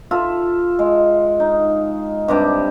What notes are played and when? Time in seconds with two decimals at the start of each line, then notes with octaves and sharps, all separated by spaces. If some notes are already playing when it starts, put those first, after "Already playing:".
0.11 F4 A4 E5
0.79 G#3
1.40 D#4
2.28 G2 C3 D4 D6